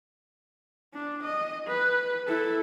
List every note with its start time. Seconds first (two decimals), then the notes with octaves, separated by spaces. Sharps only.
0.94 D4
1.24 D#5
1.68 B4
2.28 E4 A4